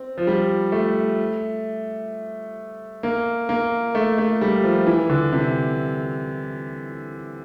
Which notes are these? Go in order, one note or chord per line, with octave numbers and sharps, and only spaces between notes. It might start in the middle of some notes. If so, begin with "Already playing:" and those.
Already playing: C4
F3
G3
A3
A#3
A#3
A3
A3
G3
F3
E3
D3
C3